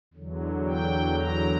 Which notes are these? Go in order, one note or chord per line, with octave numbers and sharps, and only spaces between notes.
E2 D3 F#3
G5
A#5